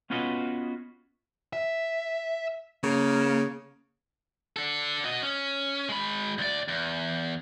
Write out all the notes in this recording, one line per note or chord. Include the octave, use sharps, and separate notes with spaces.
B3 C#4 F4 F#4 B4 D#5
E5
C#3 A#3
D4 A4
F#4 D#5
C#4
G#3 B5
D2 D5
E2